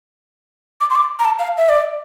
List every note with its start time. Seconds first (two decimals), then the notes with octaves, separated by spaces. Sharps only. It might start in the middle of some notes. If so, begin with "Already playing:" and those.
0.81 D6
0.90 C6
0.95 D6
1.19 A#5
1.25 A5
1.39 F5
1.57 E5
1.69 D5